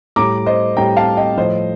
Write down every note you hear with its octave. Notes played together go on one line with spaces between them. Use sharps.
A2 G3 A#5 D6
C5 D#5
A2 G3 G5 A#5
F5 A5
D#5 G5
A2 F3 C5 D#5